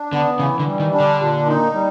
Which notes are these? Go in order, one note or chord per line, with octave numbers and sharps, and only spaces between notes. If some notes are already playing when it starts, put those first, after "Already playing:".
Already playing: D4
D3 B3
C#3 E3
D3
G3
D#3
D4
D3
A#2
D#4
G3